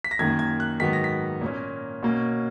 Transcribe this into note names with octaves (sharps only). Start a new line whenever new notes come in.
B6
A#6
F#2 D#3 A#3 G#6
G#6
F#6
G#2 D#3 F#3 B3 B6
A#6
B6
A#2 A#3 C#4
B2 A#3 C#4